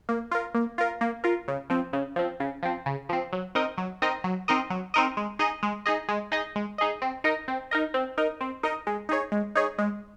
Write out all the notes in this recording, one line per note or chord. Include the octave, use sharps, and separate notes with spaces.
A#3
F4 A#4
A#3
F4 A#4
A#3
F4 A#4
C#3
F3 C4
C#3
F3 C4
C#3
F3 C4
C#3
F3 C4
F#3
C4 D#4 A#4 D#5
F#3
C4 D#4 A#4 D#5
F#3
C4 D#4 A#4 D#5
F#3
C4 D#4 A#4 D#5
G#3
D#4 G#4 D#5
G#3
D#4 G#4 D#5
G#3
D#4 G#4 D#5
G#3
D#4 G#4 D#5
C4
D#4 A#4 D#5
C4
D#4 A#4 D#5
C4
D#4 A#4 D#5
C4
D#4 A#4 D#5
G#3
D#4 G#4 C#5
G#3
D#4 G#4 C#5
G#3